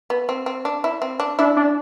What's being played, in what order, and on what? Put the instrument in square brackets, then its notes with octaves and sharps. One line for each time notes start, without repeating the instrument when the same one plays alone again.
[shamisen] B3
C4
C4
D4
E4
C4
D4
[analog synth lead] D4 [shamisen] E4
[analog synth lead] D4